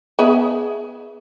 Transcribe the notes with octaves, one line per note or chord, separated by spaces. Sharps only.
B3 G#4 E5